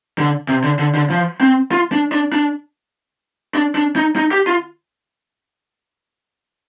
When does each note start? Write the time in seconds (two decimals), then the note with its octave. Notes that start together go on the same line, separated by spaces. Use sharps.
0.18 D3
0.49 C3
0.64 D3
0.79 D3
0.95 D3
1.10 F3
1.41 C4
1.71 F4
1.92 D4
2.12 D4
2.32 D4
3.55 D4
3.75 D4
3.96 D#4
4.16 D#4
4.31 G4
4.47 F4